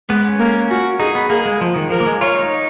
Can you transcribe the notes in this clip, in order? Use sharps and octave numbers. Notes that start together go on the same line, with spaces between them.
G#3 B3
C#4
A#3
F#4
D#4 G#4
B3
A#3 G#4
G#3
F3
D#3
F3 A#4
A#3
G#3
F4 C#5
D#4